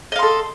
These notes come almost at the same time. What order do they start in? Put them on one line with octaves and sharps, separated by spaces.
D#5 F5 C6 A4